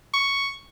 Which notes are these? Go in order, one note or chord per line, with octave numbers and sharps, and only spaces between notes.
C#6